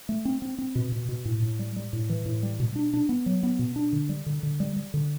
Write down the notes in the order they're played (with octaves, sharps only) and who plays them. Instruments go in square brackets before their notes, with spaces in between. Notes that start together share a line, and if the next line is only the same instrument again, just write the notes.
[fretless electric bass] A3
C4
C4
C4
B2
B2
B2
A2
A2
G3
G3
A2
E3
A2
G3
B2
D4
D4
B3
F#3
B3
B2
D4
D3
G3
D3
D3
G3
G3
D3